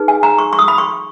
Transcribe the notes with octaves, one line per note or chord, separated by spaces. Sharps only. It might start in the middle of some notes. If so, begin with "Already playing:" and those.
Already playing: D#4 G#4 B4
G#5
A#5
C#6
C#6
D#6
B5
C#6